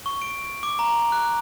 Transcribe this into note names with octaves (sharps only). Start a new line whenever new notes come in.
C#6
D7
D6
A#5
F#6